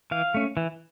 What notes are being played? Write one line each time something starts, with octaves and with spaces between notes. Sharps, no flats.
E3 F5
A3 C#4
E3